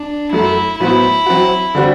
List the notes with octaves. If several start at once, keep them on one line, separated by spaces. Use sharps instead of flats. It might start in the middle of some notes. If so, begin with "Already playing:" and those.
Already playing: D4
F#2 F#3 A3 E4
A2 F#3 B3 E4 F#4 C5
F#3 C4 F#4
D3 G3 C4 F#4